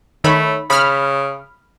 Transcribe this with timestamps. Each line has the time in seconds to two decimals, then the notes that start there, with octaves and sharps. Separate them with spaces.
0.24 D#3 A3 C#5 B5
0.70 C#3 B5 F6